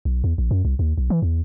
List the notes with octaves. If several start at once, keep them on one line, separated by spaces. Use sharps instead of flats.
B1
E2
A#1
F#2
C2
D#2
B1
E3
E2